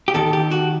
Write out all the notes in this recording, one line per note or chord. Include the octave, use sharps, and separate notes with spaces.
G4
D#2 D#3 A4
G4
F#4